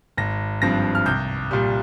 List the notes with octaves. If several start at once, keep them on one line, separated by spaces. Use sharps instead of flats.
G#1 A#6
G2 F3 C4 A#6
F6
C2 G6
A#2 G3